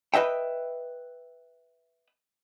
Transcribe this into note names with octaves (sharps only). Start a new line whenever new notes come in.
B4 D#5 E5 G5